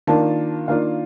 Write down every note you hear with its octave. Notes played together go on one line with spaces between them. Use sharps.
D#3 A#3 D4 F4 A5
D#3 A#3 D4 F4 F5